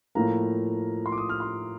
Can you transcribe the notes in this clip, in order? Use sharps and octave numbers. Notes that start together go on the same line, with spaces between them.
A2 F3 A#3 A#5
C6
D6
D#6
F6
C6